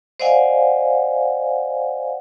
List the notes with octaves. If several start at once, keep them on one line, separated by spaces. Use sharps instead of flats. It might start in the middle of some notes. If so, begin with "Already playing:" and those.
C5 D5 D#5 F5 F#5 G#5